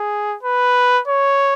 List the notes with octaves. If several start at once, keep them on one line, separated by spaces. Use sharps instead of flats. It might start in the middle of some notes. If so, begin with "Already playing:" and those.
Already playing: G#4
B4
C#5